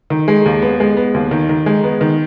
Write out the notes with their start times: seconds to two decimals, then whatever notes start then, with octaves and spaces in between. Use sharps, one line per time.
0.10 D#3
0.28 G#3
0.46 D#2
0.62 B3
0.80 G#3
0.97 B3
1.14 D#2
1.31 D#3
1.49 D#3
1.66 G#3
1.84 B3
2.01 D#3